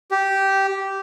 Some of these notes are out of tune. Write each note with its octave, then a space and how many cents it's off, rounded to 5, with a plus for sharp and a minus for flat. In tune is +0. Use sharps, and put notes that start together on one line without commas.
G4 -10